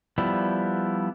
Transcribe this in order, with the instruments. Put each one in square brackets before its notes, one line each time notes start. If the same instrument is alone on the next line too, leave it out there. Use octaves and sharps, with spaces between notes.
[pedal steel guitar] F3 G3 B3 E4